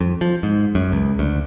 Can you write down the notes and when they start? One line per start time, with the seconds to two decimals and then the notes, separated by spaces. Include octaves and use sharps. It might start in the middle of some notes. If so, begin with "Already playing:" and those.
0.01 F2
0.21 F3
0.43 G#2
0.75 F#2
0.92 C#2
1.19 D2